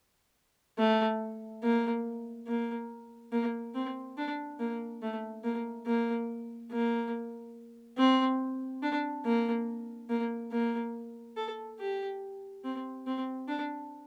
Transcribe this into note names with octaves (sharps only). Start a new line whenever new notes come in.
A3
A#3
A#3
A#3
C4
D4
A#3
A3
A#3
A#3
A#3
C4
D4
A#3
A#3
A#3
A4
G4
C4
C4
D4